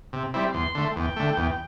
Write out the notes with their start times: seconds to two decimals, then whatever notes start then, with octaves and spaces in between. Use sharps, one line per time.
0.13 C3
0.34 G3 C4 E4
0.54 E2 C6
0.75 D3 A3
0.95 E2 G5
1.16 D3 A3
1.37 E2